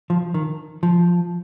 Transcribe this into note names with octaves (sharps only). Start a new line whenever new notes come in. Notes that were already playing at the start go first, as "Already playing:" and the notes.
F3
D#3
F3